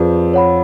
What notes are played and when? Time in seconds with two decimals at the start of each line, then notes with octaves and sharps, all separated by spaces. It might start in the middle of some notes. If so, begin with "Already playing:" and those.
Already playing: F2 F3 G#4 B4 D5
0.34 C#5 F#5 B5